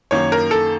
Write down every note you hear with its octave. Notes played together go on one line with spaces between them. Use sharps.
F#2 D#3 A#3 C#5
A#4
A4